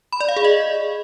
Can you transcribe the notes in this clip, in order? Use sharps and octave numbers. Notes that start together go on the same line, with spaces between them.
B5
D5
F5
G#4
D#5